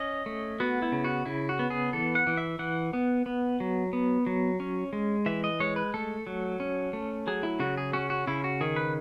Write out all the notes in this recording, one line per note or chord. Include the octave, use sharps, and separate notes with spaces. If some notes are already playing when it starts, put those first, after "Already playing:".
Already playing: C#4 D#5
A3
B3 F#4
E4
C#3
F#4
C#3 E4
F#4
B3
G#4
E3 A4
F#5
E3
E5
E3 F#5
B3
B3
F#3
B3
F#3
C#4
G#3
E3 E5
D#5
G#3 C#5
B4
A3 A4
F#3
C#4
A3
F#3 G#4
E4
C#3 F#4
G#4
C#4 F#4
F#4
C#3 E4
F#4
D#3 G#4
B4